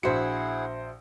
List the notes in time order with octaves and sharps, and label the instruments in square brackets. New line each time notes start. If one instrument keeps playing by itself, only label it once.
[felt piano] A#1 C5 C#7 [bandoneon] E4 G#4 F#5 [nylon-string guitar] F#4 E5